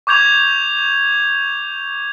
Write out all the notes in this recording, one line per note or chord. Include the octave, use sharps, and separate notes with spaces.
C#6 D6 G6 G#6 F7